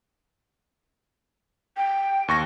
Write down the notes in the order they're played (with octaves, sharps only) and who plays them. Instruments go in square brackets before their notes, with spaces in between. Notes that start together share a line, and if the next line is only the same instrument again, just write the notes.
[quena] G5
[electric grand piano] D#2 C#6 A#6